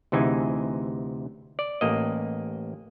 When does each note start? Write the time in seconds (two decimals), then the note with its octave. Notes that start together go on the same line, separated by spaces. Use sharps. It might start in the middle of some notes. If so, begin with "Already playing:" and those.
0.12 D2 C3 E3 D#4 G#4 G#5
1.59 D5
1.81 A1 A#3 D#5